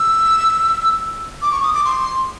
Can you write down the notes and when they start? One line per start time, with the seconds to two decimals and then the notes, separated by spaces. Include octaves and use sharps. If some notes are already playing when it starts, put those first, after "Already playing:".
Already playing: E6
1.42 D6
1.52 C#6
1.63 D#6
1.74 D6
1.85 C6